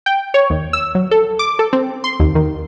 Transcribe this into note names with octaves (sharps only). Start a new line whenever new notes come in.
G5
C#5
D#2
E6
F#3
A4
D6
A4
C4
C6
D#2
D#3